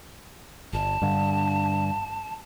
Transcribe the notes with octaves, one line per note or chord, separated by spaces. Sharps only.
G1 A5
G2 D3